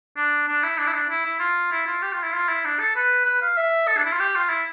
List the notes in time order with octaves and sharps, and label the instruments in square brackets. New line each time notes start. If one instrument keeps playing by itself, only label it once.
[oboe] D4
D4
E4
D4
E4
D4
E4
E4
F4
E4
F4
G4
F4
E4
F4
E4
D4
A4
B4
B4
F5
E5
A4
D4
E4
F4
G4
F4
E4